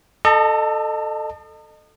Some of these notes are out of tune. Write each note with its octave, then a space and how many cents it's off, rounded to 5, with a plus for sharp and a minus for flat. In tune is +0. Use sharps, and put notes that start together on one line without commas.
A4 +0 D#5 -30 A5 +45